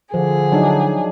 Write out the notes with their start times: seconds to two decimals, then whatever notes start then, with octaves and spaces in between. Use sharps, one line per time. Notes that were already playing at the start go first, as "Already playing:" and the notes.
0.14 D3 F3 G#4
0.52 F#3 D4 D#4